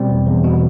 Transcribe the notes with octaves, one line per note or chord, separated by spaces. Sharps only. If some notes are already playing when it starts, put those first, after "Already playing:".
Already playing: B2 G3 C4
E2
E2
B2